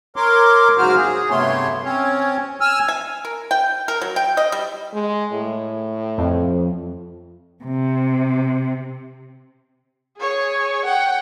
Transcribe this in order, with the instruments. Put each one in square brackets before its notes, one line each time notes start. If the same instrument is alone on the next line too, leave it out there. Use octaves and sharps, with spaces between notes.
[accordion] A#4 C#5 C6 D6
G#2 C#3 F#3 F#4 C5 F6
G#4
G2 C3 A3 B3 C#5 C6
C4 C#4 C#5
G#5 E6 F6
[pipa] G#5
A#4
G5
A#4
F#3
G5
D#5
G3
[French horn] G#3
A2
[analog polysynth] F2
[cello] C3
[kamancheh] G#4 C#5
F#5 G5